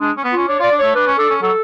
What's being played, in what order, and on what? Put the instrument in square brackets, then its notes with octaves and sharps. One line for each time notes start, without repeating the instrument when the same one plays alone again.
[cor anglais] G#3 [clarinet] D4
[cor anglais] C#4
B3
[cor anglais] C#4 [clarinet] F4
[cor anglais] D4 [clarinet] C#5
[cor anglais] F4 [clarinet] D5
[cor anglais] D4
[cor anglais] A3 [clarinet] C#5
[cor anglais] D4 [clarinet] B4
[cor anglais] C#4
[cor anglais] D4 [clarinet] A4
[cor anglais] C#4
[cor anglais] F#3 [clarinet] A4